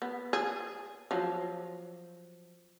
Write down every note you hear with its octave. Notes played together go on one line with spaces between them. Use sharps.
B3
G#4
F3 F#3